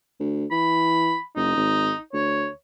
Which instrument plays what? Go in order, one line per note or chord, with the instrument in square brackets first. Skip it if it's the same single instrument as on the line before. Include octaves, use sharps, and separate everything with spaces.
[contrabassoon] D2
[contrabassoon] E3 [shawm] B5
[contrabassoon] F#1 [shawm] D#4
[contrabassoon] G#1
[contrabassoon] D2 [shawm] C#5